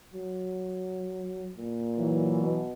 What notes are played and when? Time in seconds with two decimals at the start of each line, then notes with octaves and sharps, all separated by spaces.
0.14 F#3
1.57 A#2
1.99 E3 F#3
2.43 B2